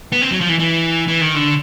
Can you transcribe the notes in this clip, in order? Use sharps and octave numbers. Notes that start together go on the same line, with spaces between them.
B3
C4
F#3
F3
E3
E3
E3
D#3
D3